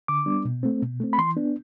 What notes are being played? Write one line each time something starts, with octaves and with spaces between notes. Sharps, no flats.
D3 D6
G3 B3 D4
B2
A3 C4
B2
A3 C4
B5
E3 C6
B3 D4